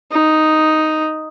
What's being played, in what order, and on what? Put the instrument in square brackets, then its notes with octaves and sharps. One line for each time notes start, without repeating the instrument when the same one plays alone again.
[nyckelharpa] D#4